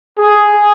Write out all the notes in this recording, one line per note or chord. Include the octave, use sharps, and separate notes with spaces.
G#4